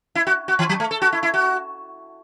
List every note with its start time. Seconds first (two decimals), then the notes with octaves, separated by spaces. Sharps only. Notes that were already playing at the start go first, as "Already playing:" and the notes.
0.15 E4
0.27 F#4
0.48 F#4
0.59 E3
0.69 F#3
0.80 A3
0.91 A4
1.02 F#4
1.12 E4
1.23 E4
1.34 F#4